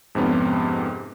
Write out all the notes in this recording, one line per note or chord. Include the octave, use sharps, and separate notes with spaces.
F2 G#2 C3 B3 C#4